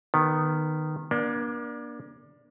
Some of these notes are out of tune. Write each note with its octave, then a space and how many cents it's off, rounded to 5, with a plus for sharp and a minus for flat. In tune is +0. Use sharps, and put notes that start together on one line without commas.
D#3 -15 B3 +0
A#3 +35 D4 +0